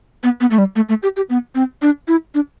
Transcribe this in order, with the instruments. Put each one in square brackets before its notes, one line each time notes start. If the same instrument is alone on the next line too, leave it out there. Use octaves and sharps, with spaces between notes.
[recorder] B3
B3
A3
G3
A3
A3
G4
G4
B3
C4
D4
E4
D4